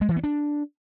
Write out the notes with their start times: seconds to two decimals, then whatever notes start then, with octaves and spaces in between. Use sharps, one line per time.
0.01 G#3
0.09 E3
0.16 B3
0.24 D4